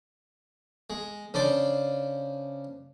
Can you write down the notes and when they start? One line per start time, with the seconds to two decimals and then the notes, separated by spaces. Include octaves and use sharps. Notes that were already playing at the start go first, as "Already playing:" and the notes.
0.90 G#3
1.34 C#3 D4 C5 D5